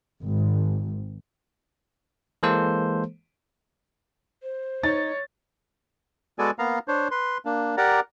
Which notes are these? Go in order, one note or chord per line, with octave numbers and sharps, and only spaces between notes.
G#1
E3 G#3 A#3 A4 C5
C5
D#4 C#5 A6
G#3 B3 F#4 A4 D5 G#5
A#3 B3 F5 A#5
D4 C5 C#5
B4 C6
A#3 D4
G4 A#4 D5 F#5 A#5